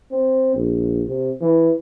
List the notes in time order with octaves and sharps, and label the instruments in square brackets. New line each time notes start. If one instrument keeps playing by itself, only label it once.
[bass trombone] C4
A#1
C3
E3